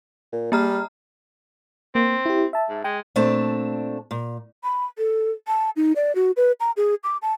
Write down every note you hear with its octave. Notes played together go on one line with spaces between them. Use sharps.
A#2
G3 A#3 A#5 F6
A#3 C4
E4 G4
E5 A5
G#2
G#3 G5
A#2 A3 C4 D4 A5
A#2
B5
A4
A5
D#4
D5
F#4
B4
A#5
G#4
D6
A5